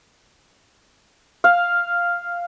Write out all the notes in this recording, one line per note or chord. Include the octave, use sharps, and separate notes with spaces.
F5